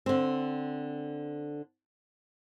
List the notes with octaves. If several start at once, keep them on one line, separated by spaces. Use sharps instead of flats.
D3 C4